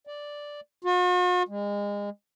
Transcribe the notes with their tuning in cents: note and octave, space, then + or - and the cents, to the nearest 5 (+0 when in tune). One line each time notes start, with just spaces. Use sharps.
D5 +0
F#4 -45
G#3 -30